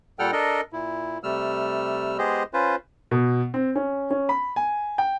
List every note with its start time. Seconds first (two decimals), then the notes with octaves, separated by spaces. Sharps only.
0.19 A#2 G3 A4 F#5 G5 F6
0.32 D4 A4 A#4 D#5
0.73 A#2 E4
1.23 C3 G3 A3 E6 F6
2.18 G#3 B3 G4 G#4 C5 D#5
2.54 C#4 F4 B4 C5
3.11 B2
3.54 C4
3.76 C#4
4.11 C#4
4.29 B5
4.56 G#5
4.98 G5